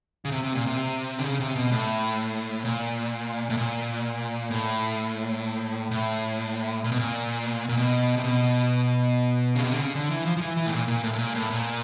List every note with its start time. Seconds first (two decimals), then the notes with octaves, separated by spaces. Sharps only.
0.25 C#3
0.31 C3
0.44 C3
0.55 A#2
0.66 C3
1.19 D3
1.24 C#3
1.40 C3
1.56 B2
1.72 A2
2.65 A#2
3.50 A2
3.57 A#2
4.51 A2
5.91 A2
6.84 A#2
6.92 B2
6.99 A#2
7.69 A#2
7.77 B2
8.17 C3
8.24 B2
9.56 C#3
9.64 C3
9.72 D3
9.79 C#3
9.95 D3
10.11 E3
10.26 F3
10.37 F3
10.41 E3
10.57 E3
10.66 A2
10.73 A#2
10.88 A#2
11.03 A2
11.13 A2
11.19 A#2
11.35 A2
11.50 A#2